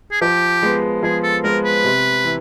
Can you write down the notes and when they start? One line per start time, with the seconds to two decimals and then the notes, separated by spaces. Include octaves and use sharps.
0.12 G#4
0.21 F3 G4
0.62 G#3 B3
1.03 F3 G#4
1.23 A4
1.44 G#3 B3 A#4
1.63 B4
1.84 C3
2.24 E3